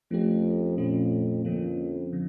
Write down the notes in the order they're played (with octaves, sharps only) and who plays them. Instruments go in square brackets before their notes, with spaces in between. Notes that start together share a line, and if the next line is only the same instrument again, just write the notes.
[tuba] F2 [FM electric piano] F3 A3 C#4 G4
[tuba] F2 [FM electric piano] A#2 A3 C#4
[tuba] F2 [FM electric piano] D3 F3 A#3 C#4
[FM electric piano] D3 F3